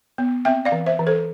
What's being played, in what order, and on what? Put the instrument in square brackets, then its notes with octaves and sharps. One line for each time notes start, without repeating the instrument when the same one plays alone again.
[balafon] B3
C4 E5 G5
D5 F5
E3
C5 E5
E3
A4 C5